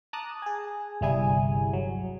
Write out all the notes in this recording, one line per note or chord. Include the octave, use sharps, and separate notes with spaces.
A5 A#5 D6 D#6 F#6
G#4 G#5
G1 C2 G3 E4 G#4 G#5
F#3